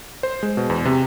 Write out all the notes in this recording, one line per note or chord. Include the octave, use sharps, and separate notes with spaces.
C5
G#3
B2
E2
C3